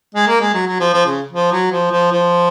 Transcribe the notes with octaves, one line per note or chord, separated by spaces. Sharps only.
G#3
A#3
G#3
F#3
F#3
F3
F3
C#3
F3
F#3
F3
F3
F3